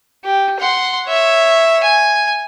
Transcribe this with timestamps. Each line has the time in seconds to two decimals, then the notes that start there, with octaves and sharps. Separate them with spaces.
0.24 G4
0.59 F#5 C6
1.08 C#5 E5
1.83 G#5